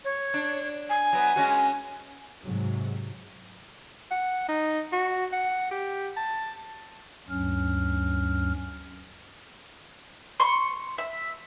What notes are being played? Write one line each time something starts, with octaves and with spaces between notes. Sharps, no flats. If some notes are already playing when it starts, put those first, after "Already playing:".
C#5
D4
G#5
F#3 B3
G#3 C#4 F#4
G#2 C3 F#3
F#5
D#4
F#4
F#5
G4
A5
D2 G2 F#3 C#4 F6
C6 C#6
E5